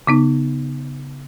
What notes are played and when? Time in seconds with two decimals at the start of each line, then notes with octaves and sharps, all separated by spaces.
0.07 C#3 B3 D#4